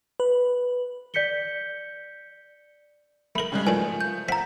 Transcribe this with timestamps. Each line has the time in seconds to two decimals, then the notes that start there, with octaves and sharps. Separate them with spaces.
0.20 B4
1.14 D5 G6 B6 C#7 G7
3.35 A3 A#4 B5 F#7
3.52 C#3 G3 G#3
3.67 G2 F3 F#3 A3 C#4 A#4 G#5
4.01 G6
4.28 C4 F5 F#5 A#5 B6